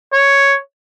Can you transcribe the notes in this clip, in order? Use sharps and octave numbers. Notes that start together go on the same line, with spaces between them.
C#5